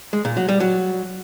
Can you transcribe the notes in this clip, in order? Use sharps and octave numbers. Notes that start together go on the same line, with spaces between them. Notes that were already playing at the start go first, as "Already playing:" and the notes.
G#3
A#2
F#3
G3
F#3